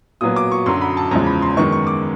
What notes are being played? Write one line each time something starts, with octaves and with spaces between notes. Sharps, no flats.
A#2 F#3 B3 D#6
D6
C#6
F#2 D3 F#3 C6
B5
A5
E2 C#3 F3 G#3 A#5
B5
C6
F#2 D#3 G#3 B3 C#6
C#6
D6